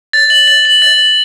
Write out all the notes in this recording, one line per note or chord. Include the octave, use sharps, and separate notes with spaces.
A6
F#7
A6
F#7
A6
F#7